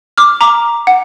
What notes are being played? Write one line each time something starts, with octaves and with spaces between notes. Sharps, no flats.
D6 F6
A#5 D6
F#5